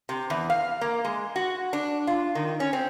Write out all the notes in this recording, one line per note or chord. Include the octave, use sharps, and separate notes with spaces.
C3
E2
F5
A#3
G#3
F#4
D4
F4
D#3
C#4
C4